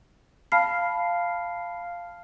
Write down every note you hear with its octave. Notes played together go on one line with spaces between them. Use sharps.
F5 A5 B5 F6 C7